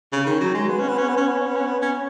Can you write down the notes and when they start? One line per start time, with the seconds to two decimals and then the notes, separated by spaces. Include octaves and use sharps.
0.12 C#3
0.26 D#3
0.41 F#3
0.54 G#3
0.69 B3
0.79 C#4
0.88 B3
0.98 C#4
1.08 B3
1.17 C#4
1.27 B3
1.37 C#4
1.47 B3
1.56 C#4
1.66 B3
1.82 C#4